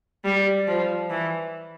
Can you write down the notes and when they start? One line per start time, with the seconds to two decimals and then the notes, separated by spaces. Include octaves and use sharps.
0.25 G3
0.67 F3
1.10 E3